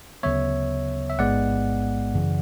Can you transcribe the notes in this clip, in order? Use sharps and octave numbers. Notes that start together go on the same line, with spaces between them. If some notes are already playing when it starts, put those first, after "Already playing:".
D2 C#3 F#3 B3 C#5 E5
E5
A1 G#2 G#3 B3 D5 F#5
F#2 C#3 E3